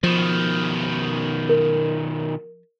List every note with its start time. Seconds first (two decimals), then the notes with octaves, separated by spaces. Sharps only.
0.03 B2 D#3 F3
1.49 A#4